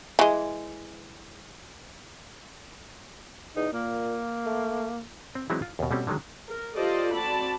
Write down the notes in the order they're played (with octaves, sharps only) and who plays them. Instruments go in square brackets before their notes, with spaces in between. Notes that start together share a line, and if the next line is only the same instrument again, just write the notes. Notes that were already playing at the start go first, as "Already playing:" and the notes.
[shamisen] E3 G#3
[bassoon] E2 [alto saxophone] D#4
[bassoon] A#2 [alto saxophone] A#3
[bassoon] A3
[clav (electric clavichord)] C4
E3 F#3 G#3 C4 D#4 E4
F4
D#2 B2
B2 G3 A3 C4 C#4
D3 D#3 F#3 G#3
[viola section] A#4
F4 G4 A4 C5 D5 D#5
C4 F#4 D5 A5 B5